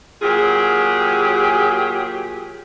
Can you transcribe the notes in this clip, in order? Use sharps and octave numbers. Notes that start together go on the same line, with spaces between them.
A#2 F#3 G4 G#4